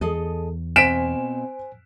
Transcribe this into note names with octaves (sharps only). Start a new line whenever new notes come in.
E2 G#4 A4 D#5
B2 C4 C5 G#5 B6 D7 E7